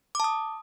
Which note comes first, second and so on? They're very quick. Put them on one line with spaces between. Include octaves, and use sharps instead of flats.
D6 A5 D#6